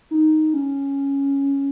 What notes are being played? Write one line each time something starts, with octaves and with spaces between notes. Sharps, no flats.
D#4
C#4